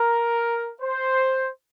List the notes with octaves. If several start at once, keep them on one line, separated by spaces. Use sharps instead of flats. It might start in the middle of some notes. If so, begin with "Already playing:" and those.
Already playing: A#4
C5